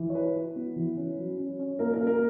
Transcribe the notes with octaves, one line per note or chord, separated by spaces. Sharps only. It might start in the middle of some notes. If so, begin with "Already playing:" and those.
Already playing: E3
C#5
E4 B4
E4
B3
E3
C#4
F#3
C#4
C#4
A#3 A#4
A#4
A#3
A#4